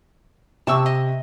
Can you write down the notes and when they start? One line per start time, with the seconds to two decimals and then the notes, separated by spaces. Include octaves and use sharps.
0.67 C3 A5 C#6 E6
0.86 D#5